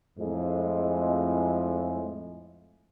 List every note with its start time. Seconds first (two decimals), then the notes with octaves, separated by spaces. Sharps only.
0.18 F2 A2 G#3